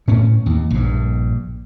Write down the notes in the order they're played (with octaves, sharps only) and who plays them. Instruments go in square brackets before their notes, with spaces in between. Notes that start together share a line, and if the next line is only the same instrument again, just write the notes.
[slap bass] A2 C#4
D#2
A#1 G2